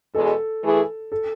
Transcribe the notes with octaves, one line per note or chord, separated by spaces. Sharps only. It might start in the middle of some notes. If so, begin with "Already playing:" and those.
E2 B2 G#3 A4
E3 A3 E4 G#4
A4